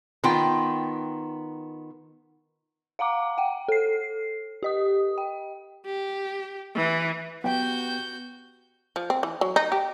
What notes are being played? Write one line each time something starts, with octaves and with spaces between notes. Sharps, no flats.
D#3 B3 F4 G5
F5 F#5 A#5 D6
F#5 G5
A4 C7
G4 D#5 D#6
G5
G4
E3
B3 F#4 G4 G5 G6
F3
C4
E3
F#3
D#4
G4